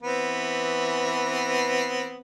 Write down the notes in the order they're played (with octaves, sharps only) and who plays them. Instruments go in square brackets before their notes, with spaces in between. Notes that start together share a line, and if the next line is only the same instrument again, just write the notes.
[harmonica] E3 B3 C4